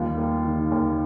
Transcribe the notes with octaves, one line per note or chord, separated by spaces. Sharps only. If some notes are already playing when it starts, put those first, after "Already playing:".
Already playing: D#2 G3 F4
A#3
D#3
D#2